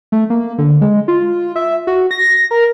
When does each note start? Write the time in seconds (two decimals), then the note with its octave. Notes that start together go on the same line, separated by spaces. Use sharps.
0.12 A3
0.30 A#3
0.58 D3
0.81 G#3
1.08 F4
1.56 E5
1.87 F#4
2.11 A#6
2.51 A#4